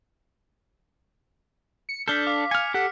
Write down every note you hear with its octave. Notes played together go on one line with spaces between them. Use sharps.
C#7
D4 A4 F6 G6 B6
F5 D6 B6
G#5 F6 C#7
G4 A4 F#5